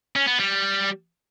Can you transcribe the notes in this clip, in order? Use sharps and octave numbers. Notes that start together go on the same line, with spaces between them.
C#4
B3
G3